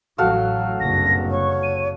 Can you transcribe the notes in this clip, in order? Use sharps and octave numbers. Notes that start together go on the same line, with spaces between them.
A1 F#3 F#4 A4 F5
F#1 C2 G2 A#6
C#5 C#6
D#7